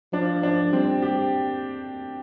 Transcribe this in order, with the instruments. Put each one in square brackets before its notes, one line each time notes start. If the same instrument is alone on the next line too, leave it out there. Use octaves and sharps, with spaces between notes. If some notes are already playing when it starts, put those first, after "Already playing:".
[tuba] F3 [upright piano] D4
[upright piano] D4
[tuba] G3 [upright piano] C4
[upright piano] G4